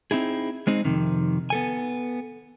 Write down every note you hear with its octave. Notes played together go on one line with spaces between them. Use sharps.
C4 D#4 E4 G#4
G#3 C4 D#4
F2 C3 D#3
B3 A4 G#5